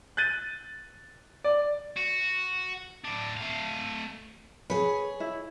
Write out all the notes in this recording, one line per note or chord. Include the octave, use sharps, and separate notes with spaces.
F#6 G6 A6 D#7
D5
F#4
A2 D4
A3 F5
G#4 B4 C#5
E4